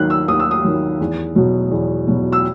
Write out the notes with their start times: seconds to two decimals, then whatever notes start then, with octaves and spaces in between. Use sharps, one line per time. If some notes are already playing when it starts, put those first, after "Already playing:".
Already playing: D#2 D#3 F#3 F#6
0.10 E6
0.28 D#2 D#6
0.40 E6
0.51 D#6
0.64 D#3 F#3
1.00 E2
1.35 B2 F#3
1.71 E2
2.07 B2 F#3
2.32 E6